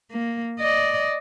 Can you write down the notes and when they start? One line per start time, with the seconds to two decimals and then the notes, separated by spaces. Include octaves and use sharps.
0.11 A#3
0.59 D5 D#5